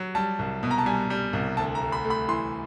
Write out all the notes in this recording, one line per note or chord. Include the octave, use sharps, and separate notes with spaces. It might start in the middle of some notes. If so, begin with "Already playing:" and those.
Already playing: F#3
G3 A5
C2
B2
A#5
A5
G3 G#5
G3
C2
D2 A5
A#5
D2
B5
A3
B5
E3 C6